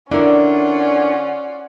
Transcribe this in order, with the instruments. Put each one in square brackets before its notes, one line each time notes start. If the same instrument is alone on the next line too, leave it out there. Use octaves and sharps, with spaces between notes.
[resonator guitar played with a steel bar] D3 [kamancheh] C#4 F#5 [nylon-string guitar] D4 E4 A#4 [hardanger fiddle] F4 D5